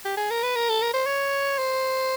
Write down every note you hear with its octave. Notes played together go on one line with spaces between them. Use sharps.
G4
G#4
A#4
B4
A#4
A4
A#4
C5
C#5
C5